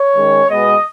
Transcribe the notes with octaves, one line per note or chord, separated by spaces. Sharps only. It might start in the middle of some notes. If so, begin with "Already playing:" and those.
Already playing: C#5
D#3 G#3 C#4
B2 G#3 B3 D#5